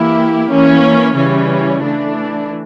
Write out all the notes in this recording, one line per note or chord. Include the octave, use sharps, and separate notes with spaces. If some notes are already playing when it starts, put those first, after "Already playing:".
Already playing: E3 A#3 E4 G4
E3 A#3 C#4
C#3 E3 G3 C#4
E3 A3 D4